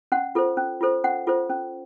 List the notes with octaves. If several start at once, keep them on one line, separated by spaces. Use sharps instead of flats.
C#4 F#5
F4 A4 C5
C#4
F4 A4 C5
C#4 F#5
F4 A4 C5
C#4